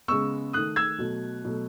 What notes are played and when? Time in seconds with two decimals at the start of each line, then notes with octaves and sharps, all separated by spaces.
0.08 C#3 G#3 B3 C#6 E6
0.53 D#3 A3 D#6 F#6
0.76 E6 G#6
0.98 B2 F#3 A3
1.44 B2 F#3 A3